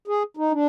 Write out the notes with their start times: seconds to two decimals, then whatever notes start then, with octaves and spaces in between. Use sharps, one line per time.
0.08 G#4
0.37 D#4
0.52 D4